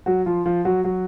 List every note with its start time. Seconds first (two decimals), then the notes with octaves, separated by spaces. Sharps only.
0.06 F#3 F#4
0.26 F3 F4
0.46 F3 F4
0.65 F#3 F#4
0.84 F#3 F#4